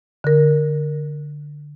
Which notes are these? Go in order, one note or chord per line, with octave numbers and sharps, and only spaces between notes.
D3 A#4